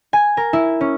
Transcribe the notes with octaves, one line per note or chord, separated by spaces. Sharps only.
G#5
A#4
E4
C#4